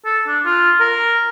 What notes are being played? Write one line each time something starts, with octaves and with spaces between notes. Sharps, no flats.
A4
D4
F4
A#4